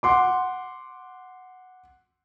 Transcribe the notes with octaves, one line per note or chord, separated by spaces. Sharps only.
F#5 C6 D6